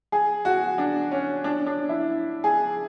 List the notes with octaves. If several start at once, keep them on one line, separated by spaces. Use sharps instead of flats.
G#4
F#4
D4
C#4
D4
D4
E4
G#4